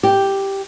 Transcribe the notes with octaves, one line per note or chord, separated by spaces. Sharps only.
G4